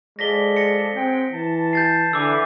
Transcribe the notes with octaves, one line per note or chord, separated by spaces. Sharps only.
F3 G#3 A4 D5 A#6 B6 G7
A#6 C#7
F#3 G#3 C4 G5
E3 A5
G6 A6 C7
D3 E3 D6 E6